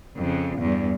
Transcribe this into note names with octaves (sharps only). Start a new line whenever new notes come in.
F2 C#3
E2 G2